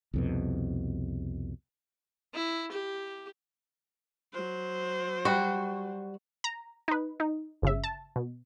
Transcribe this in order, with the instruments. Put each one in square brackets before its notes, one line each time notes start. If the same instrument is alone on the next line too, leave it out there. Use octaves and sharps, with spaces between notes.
[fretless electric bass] C2 F2 B2
[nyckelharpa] E4
G4
[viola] F#3 C5
[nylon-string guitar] G3 [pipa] F#4
[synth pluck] A#5
D#4 B4
D#4
G1 C#3 E5
A5
B2